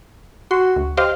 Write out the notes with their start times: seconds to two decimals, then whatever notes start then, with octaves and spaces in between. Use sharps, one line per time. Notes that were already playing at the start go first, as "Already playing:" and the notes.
0.51 F#4 C6
0.76 D2
0.97 G4 C5 D#5 F5